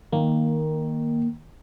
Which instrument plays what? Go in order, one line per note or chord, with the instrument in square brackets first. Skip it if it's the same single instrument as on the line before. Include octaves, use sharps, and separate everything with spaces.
[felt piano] D#3 [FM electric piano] A#3